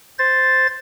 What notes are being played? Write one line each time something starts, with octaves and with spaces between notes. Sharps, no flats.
C5 A6